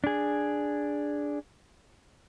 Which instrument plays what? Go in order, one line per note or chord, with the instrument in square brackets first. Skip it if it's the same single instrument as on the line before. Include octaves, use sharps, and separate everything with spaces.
[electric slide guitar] D4 G#4